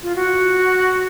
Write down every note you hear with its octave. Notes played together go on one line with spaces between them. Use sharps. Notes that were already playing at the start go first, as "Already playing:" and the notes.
F4
F#4